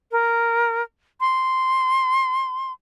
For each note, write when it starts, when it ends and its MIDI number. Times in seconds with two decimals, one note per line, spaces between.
0.11 0.82 70
1.20 2.72 84